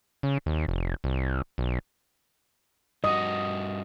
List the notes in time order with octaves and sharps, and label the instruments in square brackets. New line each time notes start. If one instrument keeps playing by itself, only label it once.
[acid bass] C#3
D#2
F1
C2
B1
[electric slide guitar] G2 F#4 [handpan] D#5 [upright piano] D#6